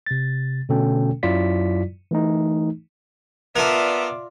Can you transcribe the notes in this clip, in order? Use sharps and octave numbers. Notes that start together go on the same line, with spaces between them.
C3 A6
B2 D3 A3 C#4 A4 G5
F#2 F#3 E4 F4 D5 B6
E3 A3 D#4
B3 D4 F4 A#4 D5 E5